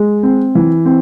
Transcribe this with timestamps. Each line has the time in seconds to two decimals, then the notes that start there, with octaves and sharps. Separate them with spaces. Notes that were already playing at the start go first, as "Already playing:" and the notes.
Already playing: G#3
0.23 C4
0.55 E3
0.86 C4